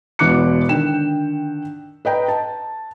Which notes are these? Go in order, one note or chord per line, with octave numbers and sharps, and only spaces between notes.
E1 B2 E3 D6 F#6 C#7
D3 D#3 G5 E7
B4 D#5 G5 A#5
A5